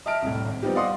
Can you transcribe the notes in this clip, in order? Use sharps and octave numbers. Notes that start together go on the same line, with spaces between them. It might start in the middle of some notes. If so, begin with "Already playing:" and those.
D#5 E5 A5 F6 D7
C2 A2
G#1
F3 G3 B3 C4 D#4 G4
D5 D#5 F5 F#5 C6 D#6